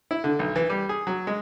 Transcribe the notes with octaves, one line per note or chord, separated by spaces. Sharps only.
E4
D3
B1
E3
G3
G#4
F#3
G#3